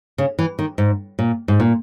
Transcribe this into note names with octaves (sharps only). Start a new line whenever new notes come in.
C#3
E3
D#3
G#2
A#2
G#2
A#2